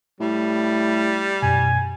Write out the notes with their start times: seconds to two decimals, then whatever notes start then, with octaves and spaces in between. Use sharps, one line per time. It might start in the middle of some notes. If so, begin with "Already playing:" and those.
0.20 A2 G3
1.42 F#2 B2 G#5